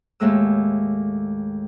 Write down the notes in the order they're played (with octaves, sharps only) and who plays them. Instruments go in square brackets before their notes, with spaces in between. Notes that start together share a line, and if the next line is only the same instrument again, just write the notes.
[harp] D#2 A2 G#3 E6